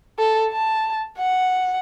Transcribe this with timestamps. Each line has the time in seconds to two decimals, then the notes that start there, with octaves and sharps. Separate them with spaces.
0.19 A4
0.51 A5
1.18 F#5